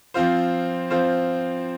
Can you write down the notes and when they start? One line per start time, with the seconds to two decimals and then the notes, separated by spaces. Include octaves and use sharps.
0.14 F3 C4 F4 C5
0.90 F3 C4 F4 C5